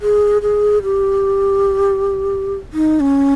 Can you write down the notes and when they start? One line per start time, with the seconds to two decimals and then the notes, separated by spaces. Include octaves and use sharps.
0.01 G#4
0.42 G#4
0.83 G4
2.73 D#4
3.00 C#4